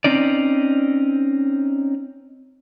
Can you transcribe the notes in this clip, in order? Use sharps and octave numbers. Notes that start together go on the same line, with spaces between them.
C4 C#4 D#4 D5